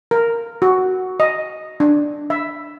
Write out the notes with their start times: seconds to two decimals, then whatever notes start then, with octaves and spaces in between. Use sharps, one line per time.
0.11 A#4
0.62 F#4
1.20 D#5
1.80 D4
2.30 E5